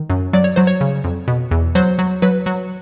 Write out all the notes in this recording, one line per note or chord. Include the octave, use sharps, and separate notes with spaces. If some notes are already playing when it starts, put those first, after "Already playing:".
Already playing: D#3
F#2
F#3 D5
C#5
F#3 C5
C#5
C#3
F2
B2
E2
F#3 C5
F#3
F#3 B4
F#3